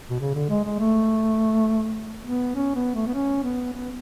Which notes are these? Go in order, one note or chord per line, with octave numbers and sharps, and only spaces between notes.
B2
C#3
D3
G#3
G#3
A3
B3
C#4
B3
A3
B3
C#4
B3
B3